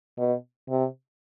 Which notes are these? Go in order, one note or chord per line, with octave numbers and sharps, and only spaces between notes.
B2
C3